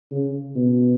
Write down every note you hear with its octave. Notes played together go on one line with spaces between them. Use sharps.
C#3
B2